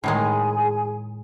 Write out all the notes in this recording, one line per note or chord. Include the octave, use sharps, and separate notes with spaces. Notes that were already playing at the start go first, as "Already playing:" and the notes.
A2 D#3 G#3 G#4 G#5